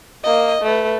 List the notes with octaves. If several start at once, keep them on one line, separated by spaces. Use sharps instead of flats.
A#3 D#5
A3 B4